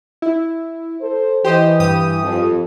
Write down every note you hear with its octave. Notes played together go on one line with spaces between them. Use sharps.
E4
A4 C5
E3 G4 C5 D#5
G2 G4 D#6
F2